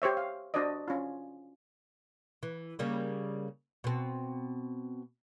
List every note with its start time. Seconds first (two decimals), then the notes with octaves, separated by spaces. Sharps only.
0.02 G4 C5 C#5 E5
0.17 F5
0.54 D4 F#4 C5 D5 D#5
0.88 C#4 F4
2.43 E3
2.79 C#3 G3 A#3
3.84 B2 C4